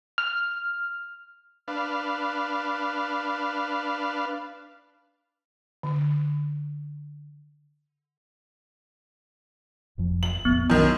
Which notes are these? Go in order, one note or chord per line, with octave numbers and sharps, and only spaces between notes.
F6
D4 B4 F5
D3
F#1 F2 F3
F#7
F1 A#1 F2 B3
B1 F#2 D#3